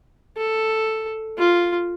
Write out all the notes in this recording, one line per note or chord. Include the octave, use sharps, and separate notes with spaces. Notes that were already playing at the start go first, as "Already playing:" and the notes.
A4
F4